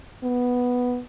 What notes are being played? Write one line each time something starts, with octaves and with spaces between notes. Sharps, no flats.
B3